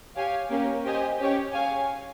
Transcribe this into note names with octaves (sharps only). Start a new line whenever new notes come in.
G4 C#5 F5 G#5
A#3 C#4 G4
G4 C5 D#5 G#5
C#4 G4 C#5
G#4 C#5 F5 G#5